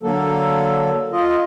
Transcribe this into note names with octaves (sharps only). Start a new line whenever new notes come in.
D3 F#3 A#3 A4
F4 D#5